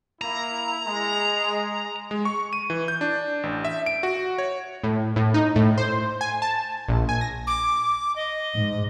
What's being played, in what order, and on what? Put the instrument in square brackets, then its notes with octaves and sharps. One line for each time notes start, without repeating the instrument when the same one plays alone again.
[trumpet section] A#3 E4 [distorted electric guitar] A#5
[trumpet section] G#3
[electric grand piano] G#3
C#6
D#7
E3
G6
D4
A1
E5
D7
F#4
C#5
[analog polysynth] A2
A2
D#4
A2
C5
G#5
A5
A#1
G#5
A#6
[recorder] D6
D#5
[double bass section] G#2